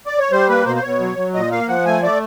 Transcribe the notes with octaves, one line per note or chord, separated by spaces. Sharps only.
D5
C#5
G3 C5
A#3 B4
B2 C5
C5
B2 C#5
F#3
F#3
A#2 D#5
A#3 F5
F3 F#5
A3 G#5
A3 D5